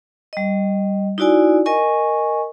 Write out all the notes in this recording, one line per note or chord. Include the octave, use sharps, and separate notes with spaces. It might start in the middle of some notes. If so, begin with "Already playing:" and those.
G3 D#5
D#4 E4 F#4 D5 G#5
A#4 D#5 G#5 C#6